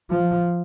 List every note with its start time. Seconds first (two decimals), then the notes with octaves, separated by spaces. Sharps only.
0.11 F3